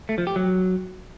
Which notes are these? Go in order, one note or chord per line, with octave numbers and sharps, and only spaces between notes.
A3
F3
G4
F#3